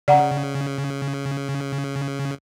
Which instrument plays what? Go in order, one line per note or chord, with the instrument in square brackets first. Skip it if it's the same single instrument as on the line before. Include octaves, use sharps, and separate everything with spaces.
[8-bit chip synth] C#3 [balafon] D5 F#5 A#5